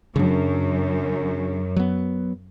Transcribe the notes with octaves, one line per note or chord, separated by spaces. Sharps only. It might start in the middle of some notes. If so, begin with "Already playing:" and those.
F#2 C#3 D4
F#3 B3